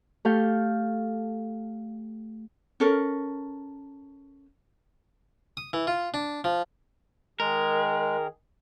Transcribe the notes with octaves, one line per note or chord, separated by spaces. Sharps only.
A3 G4 A4 F5 G6
C#4 A4 A#4
D#6
E3
F4
D4
F3
D#3 G#3 G#4 A#4